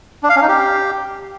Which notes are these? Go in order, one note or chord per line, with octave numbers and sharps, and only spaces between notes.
D4
F5
C#4
D#4
G4